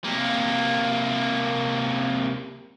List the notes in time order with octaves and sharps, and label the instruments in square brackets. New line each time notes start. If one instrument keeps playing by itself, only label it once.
[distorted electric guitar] C3 A#3